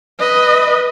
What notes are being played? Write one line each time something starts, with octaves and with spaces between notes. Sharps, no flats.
B4 D#5